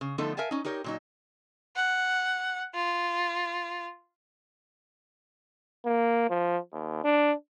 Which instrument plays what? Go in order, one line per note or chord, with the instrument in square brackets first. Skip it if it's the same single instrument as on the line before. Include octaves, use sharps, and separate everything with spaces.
[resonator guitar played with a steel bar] C#3
D3 F3 A3 B3 D#4 A4
A#4 E5 F5 G#5 A5
C#4 D#4
D#4 G4 A#4 C#5
A#2 F#3 D#4
[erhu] F#5
F4
[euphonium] A#3
F3
D#2
D4